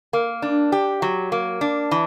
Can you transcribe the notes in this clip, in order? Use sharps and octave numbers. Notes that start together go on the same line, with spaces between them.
A#3
D4
G4
F#3
A#3
D4
E3